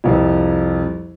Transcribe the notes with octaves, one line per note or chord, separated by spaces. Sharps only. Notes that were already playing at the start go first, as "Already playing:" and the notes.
C2 F2